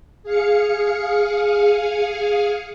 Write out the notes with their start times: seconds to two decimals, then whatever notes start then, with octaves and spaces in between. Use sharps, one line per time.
0.23 G#4 F5 C#7